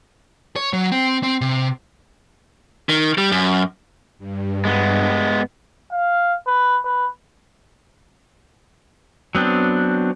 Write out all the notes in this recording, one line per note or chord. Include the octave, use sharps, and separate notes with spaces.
C#5
F#3
C4
C4
C3
D#3
G3
F#2
G2
G#3 B3
F5
B4
B4
F#3 B3 C4 D4